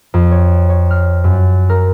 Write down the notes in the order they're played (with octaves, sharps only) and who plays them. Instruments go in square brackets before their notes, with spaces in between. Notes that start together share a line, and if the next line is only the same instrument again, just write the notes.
[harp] F2
C#5
C#5
F6
F#2
A#4